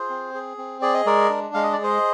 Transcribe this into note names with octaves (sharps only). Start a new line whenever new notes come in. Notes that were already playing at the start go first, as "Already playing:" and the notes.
Already playing: F4 G#4 C5
C4
G#4
C4
G#4 D5
D#5
G#3 A#4 D5
D4
G#3 F5
D#5
D5
G#4
C5 D#5